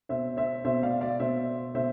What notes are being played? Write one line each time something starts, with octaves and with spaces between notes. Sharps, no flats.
B2 C5 E5
C5 E5
B2 C5 E5
D5 F5
D5 F5
B2 C5 E5
B2 C5 E5